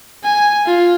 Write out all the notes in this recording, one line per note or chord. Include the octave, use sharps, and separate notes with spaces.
G#5
F4